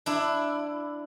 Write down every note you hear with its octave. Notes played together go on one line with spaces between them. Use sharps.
D4 E4